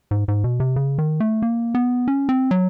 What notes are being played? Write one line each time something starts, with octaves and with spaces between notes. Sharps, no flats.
G#2
G#2
B2
C3
C#3
D#3
A3
A#3
B3
C#4
C4
F#3